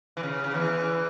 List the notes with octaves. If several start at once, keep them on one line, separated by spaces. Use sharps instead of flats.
E3
C#3
C#3
E2 E3